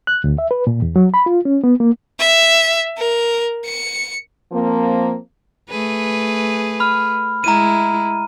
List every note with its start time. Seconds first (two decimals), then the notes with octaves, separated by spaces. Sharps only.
0.07 F#6
0.24 D2
0.38 E5
0.51 B4
0.67 A#2
0.82 E2
0.96 F#3
1.14 B5
1.26 F4
1.45 C#4
1.64 B3
1.80 A#3
2.20 E5
2.98 A#4
3.66 C#7
4.52 F3 A#3 C4
5.70 A3 G#4 B4
6.80 B5 F6
7.44 G#3 E4 A#5 D#7